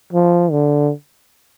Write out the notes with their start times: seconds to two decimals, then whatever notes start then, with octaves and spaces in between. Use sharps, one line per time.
0.13 F3
0.52 D3